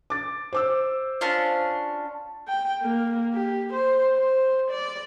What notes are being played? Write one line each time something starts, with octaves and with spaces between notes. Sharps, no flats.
D6 A6
C5 D6 E6
C#4 D4 F4
G5
A#3
G4
C5
C5
D5